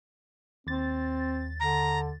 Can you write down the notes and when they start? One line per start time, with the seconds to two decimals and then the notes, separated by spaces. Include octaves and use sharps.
0.67 D#2 C4 A6
1.60 D3 A#5